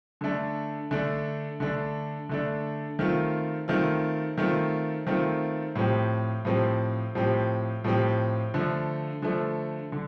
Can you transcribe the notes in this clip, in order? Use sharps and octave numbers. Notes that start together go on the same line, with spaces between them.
D3 A3 D4
D3 A3 D4
D3 A3 D4
D3 A3 D4
D#3 A3 C4 F4
D#3 A3 C4 F4
D#3 A3 C4 F4
D#3 A3 C4 F4
A2 F3 C4 G4
A2 F3 C4 G4
A2 F3 C4 G4
A2 F3 C4 G4
D3 F3 A3
D3 F3 A3
D3